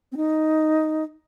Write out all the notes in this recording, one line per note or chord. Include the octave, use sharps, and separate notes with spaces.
C4
D#4